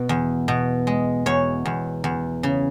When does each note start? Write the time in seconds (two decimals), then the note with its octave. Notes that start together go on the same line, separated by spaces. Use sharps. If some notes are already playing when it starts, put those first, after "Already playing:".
Already playing: B2
0.09 E2
0.48 B2
0.87 G#3
1.26 E2 C#5
1.65 E2
2.04 E2
2.43 C#3